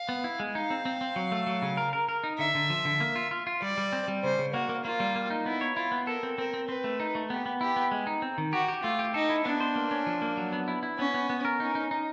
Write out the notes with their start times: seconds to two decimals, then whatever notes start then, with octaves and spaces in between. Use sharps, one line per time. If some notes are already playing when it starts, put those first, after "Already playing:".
Already playing: F5
0.09 B3
0.24 E4
0.40 G#3
0.55 D#4 F5
0.70 C4
0.85 C4
1.01 C4
1.16 F#3
1.32 A3
1.47 F#3
1.62 C#3
1.77 A#4
1.93 A#4
2.09 A#4
2.24 D#4
2.39 D3 E5
2.55 D3
2.70 F3
2.85 D3
3.00 A#3
3.16 F4
3.31 F4
3.47 F4
3.62 G3 D5
3.78 G3
3.93 C4
4.08 G3
4.24 C#3 C5
4.39 C#3
4.54 A#3 F#4
4.69 A#3
4.84 A#3 F4
5.00 G3
5.15 A#3
5.30 D#4
5.46 B3 E4
5.61 C#5
5.76 E4 F4
5.92 B3
6.07 A4 A#4
6.23 C4
6.38 C4 A#4
6.54 C4
6.68 C4 B4
6.84 A3
7.00 D#4
7.15 A3
7.30 B3 G4
7.46 B3
7.61 E4 G4
7.76 B3
7.92 G#3
8.07 D#4
8.22 C4
8.38 D#3
8.53 F#4 G4
8.68 G4
8.83 A3 F4
8.99 G4
9.14 D#4 A4
9.30 E4
9.45 B3 D4
9.60 C5
9.76 A#3
9.91 C#4
10.07 F3
10.22 A#3
10.37 F#3
10.53 B3
10.68 E4
10.83 E4
10.99 B3 C#4
11.14 B3
11.30 B3
11.45 A#4
11.60 C#4 D#4
11.75 D#4
11.91 D#4